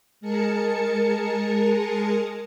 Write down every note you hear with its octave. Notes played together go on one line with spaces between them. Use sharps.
G#3 G#4 A#4 A5 C#7